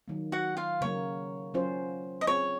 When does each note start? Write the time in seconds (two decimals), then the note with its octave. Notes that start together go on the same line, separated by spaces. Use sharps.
0.08 D#3 F#3 A#3
0.32 F#4 F#5
0.57 F4 F5
0.81 C#3 F#3 A#3 C#5
1.54 F#3 C#4 F4 C5
2.21 D#5
2.27 C4 F4 G#4 C#5